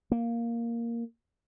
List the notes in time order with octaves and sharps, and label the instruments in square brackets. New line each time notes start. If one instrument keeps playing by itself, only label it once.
[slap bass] A#3